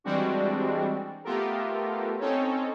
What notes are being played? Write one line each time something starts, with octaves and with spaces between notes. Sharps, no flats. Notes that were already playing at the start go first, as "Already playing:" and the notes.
E3 G3 G#3 C4 D4 F#4
A3 B3 F4 G4 A4 A#4
C4 C#4 D#4 A4 C#5